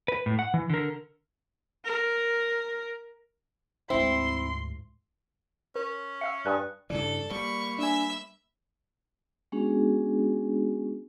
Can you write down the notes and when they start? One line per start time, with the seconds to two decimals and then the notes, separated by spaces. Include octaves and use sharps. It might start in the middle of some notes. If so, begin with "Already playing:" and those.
0.08 B4
0.26 A2
0.39 F#5
0.54 E3
0.70 D3 A#4
1.85 A#4
3.90 D2 G#2 C4 E4 C6
5.76 C#4 A#4
6.21 E5 F5 E6 C#7
6.46 G2 G5 G#5 D#6 F#6
6.90 G2 C#3 E3 A4 D5
7.31 G3 A#3 B5 C#6
7.79 D4 E5 G#5 E6
9.52 G#3 B3 C#4 D4 F#4 G#4